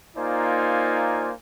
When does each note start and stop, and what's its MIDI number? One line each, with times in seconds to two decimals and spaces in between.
0.17 1.32 58
0.17 1.32 63
0.17 1.32 65
0.17 1.32 72
0.17 1.32 74
0.17 1.32 80